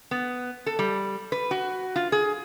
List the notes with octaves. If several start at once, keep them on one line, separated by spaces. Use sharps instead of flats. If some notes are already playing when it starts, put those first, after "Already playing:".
B3
A4
G3
B4
F#4
F4
G#4